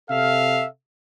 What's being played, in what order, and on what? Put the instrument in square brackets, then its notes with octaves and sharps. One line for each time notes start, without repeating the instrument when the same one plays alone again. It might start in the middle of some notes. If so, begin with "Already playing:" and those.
[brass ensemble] C3 A4 E5 F5